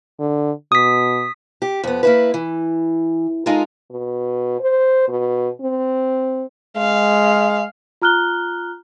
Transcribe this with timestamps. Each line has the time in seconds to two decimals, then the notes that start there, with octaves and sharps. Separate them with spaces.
0.20 D3
0.72 B2 D#6 B6
1.62 G4
1.83 F2 B3
2.03 A#3 E4 B4
2.34 E3
3.46 G#3 D#4 F4 A4 A#4
3.91 B2
4.60 C5
5.08 B2
5.61 C4
6.77 G#3 F5
8.02 F4 A#5 F6 F#6 G7